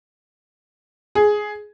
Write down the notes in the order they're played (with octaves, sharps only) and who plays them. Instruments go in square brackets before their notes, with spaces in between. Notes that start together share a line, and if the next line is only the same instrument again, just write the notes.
[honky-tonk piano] G#4